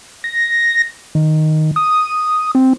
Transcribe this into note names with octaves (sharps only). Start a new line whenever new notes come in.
A#6
D#3
D#6
C4